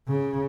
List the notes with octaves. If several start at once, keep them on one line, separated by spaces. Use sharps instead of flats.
C#3